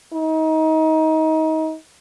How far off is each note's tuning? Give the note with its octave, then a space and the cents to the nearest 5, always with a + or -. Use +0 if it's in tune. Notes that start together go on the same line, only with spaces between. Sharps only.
D#4 +25